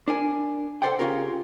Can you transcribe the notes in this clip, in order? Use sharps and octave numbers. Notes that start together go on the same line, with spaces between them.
D4 A#4 G#5
A4 B4 C5 D5 F#5 G5
C#3 C4 C#4 F4 G4 A#4